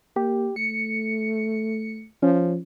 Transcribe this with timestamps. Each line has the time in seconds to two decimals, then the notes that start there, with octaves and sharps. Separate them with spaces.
0.16 A#3 G4
0.56 A3 C#7
2.23 F3 C#4